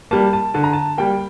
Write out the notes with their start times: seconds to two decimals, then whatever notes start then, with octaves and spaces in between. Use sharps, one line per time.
0.11 G3 A#3 A5
0.33 A5
0.54 D3 A5
0.64 A#5
0.73 A5
0.98 G3 A#3 G5